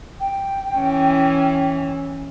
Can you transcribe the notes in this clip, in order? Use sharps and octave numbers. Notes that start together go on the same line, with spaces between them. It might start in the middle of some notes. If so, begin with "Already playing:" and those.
G5
E3 C#4